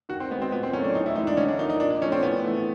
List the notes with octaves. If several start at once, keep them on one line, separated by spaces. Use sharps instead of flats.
D#3 F#4
C4
G#3 B3
C4
A#2 B3
C4
F#3 A3 C#4
D4
A2 D#4
E4
E3 G#3 D#4
D4
D3 C#4
D4
F3 A#3 D#4
D#4
A#2 D4
D4
F3 A3 C#4
C4
A2 B3
E3 A3